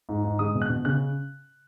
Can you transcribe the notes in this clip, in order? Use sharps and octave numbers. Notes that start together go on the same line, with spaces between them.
G#2
G#2
G#3 D#6
B2
F#6
B2
C#3 F#6